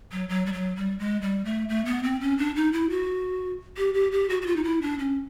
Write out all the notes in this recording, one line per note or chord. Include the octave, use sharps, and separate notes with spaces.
F#3
F#3
G3
F#3
G3
G#3
G3
A3
A3
B3
C4
C#4
D4
D#4
E4
F#4
G4
G4
G4
F#4
F#4
F4
D#4
E4
D4
C#4